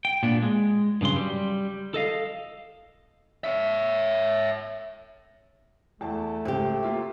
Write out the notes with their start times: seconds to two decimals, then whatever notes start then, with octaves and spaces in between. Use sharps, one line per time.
0.05 G5
0.23 A#2 B3 D4
0.43 G#3
1.01 G2 C#3 F#3 C6
1.16 G3
1.94 A4 D#5 F5
3.44 C#5 E5
6.01 E2 A3 A5
6.45 C#2 C4 G4
6.83 A#3 F4 E5